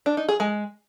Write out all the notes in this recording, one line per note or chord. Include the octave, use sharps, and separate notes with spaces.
D4
D#4
G#4
G#3